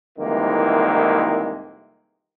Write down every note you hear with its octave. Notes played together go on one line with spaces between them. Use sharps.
C2 F2 D#3 E3 G#3 A#3